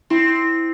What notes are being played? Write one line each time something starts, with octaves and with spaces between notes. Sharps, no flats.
C4 E4